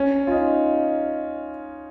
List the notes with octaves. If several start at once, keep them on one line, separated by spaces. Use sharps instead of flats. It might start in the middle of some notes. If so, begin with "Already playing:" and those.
Already playing: C#4
F4
D#4